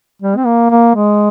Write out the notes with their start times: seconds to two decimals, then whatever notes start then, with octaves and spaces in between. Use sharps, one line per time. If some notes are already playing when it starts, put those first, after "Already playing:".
0.22 G3
0.37 C4
0.46 A#3
0.70 A#3
0.95 G#3